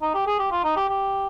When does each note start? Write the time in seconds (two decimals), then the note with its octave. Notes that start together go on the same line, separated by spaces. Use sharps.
0.02 D#4
0.14 G4
0.27 G#4
0.39 G4
0.51 F4
0.64 D#4
0.77 G4
0.89 G4